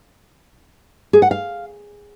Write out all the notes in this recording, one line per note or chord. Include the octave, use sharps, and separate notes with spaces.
G#4
F#5
F5